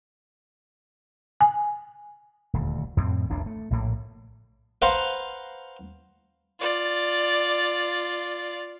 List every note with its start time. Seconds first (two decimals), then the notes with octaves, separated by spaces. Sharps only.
1.41 G#5
2.53 D#1 D2
2.97 F2 A2 A3 C4
3.29 D#1 A1 D4
3.46 A3
3.70 A#1 A2 A#3
4.82 B4 C5 F5 F#5 A#5 C6
6.60 F4 D5